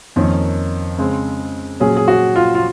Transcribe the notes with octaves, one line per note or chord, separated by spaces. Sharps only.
F2 D#3 A#3 C#4
C#3 G#3 C4
A#2 F#3 C#4 G#4
G#4
F#4
F4
F4